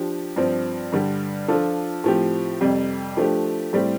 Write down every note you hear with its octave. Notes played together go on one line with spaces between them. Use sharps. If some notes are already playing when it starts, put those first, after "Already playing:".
Already playing: F3 D4 G4
G2 F3 C4
G2 D3 G3
F3 D4 F4 A4
A2 F3 C4 G4
F2 C3 G3
F3 A3 D4 G4
A2 G3 C4 G4